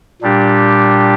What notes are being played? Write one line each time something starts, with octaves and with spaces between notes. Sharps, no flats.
A#2 G3 D4 G4